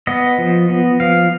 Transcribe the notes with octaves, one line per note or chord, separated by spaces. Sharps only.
B3 D#5
F3
B3
F3 F5